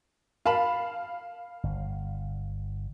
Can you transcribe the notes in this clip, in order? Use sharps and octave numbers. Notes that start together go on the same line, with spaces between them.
A#4 F5 A5 B5
G1